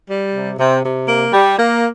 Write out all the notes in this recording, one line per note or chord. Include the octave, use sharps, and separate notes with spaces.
G3
C3
C3
C3
A#3
G3
A#3